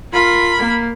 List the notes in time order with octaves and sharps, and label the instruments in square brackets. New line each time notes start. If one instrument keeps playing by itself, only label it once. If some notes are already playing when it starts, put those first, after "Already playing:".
[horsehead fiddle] F4 [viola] A#4 B5
[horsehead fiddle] A#3